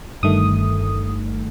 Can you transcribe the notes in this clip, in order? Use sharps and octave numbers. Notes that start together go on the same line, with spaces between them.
G1 G2 D#3 A3 D#6